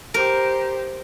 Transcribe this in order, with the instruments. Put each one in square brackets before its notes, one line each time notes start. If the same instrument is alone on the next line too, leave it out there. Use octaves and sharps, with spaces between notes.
[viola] G4 C5 [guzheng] A#4